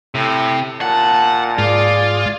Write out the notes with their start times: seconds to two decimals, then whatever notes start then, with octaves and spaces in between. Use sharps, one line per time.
0.15 A2 C3
0.81 A#2 F#5 A5
1.58 G#2 F4 G#4 D5